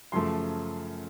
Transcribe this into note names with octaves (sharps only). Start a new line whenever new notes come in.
F#2 C#3 F3 A3 C6